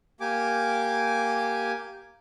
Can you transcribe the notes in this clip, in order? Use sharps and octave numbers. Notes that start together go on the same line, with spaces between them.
A#3 G4 G#5 D6